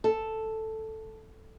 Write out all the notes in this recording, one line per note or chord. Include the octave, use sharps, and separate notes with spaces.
A4